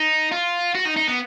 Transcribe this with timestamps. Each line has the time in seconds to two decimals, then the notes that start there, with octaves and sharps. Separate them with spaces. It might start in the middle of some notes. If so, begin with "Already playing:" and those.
Already playing: D#4
0.32 F4
0.75 F#4
0.85 D#4
0.96 D#4
1.07 B3